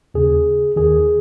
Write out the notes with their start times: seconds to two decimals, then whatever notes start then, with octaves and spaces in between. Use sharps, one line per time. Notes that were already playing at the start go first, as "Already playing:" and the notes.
0.14 D#2 C#3 G#4
0.76 D#2 D#3 G#4